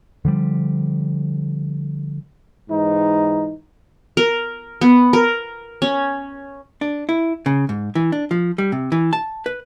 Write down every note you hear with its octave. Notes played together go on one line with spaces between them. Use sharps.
D3 F3 G3
G#2 E3 D#4
A#4
B3
A#4
C#4
D4
E4
C#3
G#2
E3
D4
F3
G3
C3
E3
A5
B4